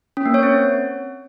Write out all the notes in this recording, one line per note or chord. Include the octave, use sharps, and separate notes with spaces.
C#4
A#3
C#5
C4